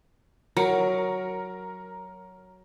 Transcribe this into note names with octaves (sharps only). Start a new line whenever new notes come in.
F#3 A#4 C#7